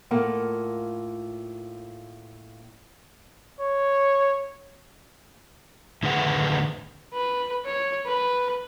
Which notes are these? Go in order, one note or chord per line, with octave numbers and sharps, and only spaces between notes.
A2 A#3 F4 A4 A#4 F#5
C#5
A2 D3 D#3 G#4 B4 F#5
B4
C#5
B4